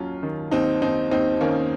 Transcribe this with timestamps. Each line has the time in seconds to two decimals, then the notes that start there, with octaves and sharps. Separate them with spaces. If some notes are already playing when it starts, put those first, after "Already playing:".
Already playing: D#2 F#3 C#4 F4
0.23 D#3
0.51 D#2 C4 D#4
0.82 D#2 C4 D#4
1.11 D#2 C4 D#4
1.41 D#3 A#3 C#4